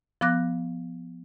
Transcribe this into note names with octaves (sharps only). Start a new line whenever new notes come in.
F3 B3 D6 F#6 A#6